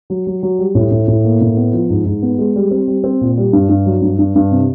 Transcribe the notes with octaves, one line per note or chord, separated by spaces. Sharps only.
F#3
F#3
F#3
G3
A2
A2
A2
A#3
A2
B3
F3
G#2
G#2
B3
G#3
G3
C4
G3
C4
A#2
G3
G2
G2
F#3
G2
G2
G2
C3